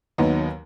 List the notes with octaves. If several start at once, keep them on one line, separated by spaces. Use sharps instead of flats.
D#2 D#3 F#3 B3 D#4